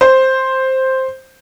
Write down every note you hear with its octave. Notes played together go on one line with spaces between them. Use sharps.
C5